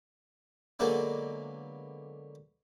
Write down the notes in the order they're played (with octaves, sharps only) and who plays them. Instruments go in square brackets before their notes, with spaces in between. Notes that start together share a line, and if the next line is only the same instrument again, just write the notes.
[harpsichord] D3 F#3 G#3 A#3 B3 D4